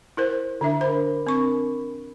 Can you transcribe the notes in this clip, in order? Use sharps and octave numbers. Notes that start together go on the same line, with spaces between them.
E4 A#4 C5
D3 D4 E5
D4 A#4 C5 B5
C4 C#6